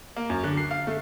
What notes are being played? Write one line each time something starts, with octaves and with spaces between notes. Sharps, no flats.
A#3
F#2
D3
C7
F5
A3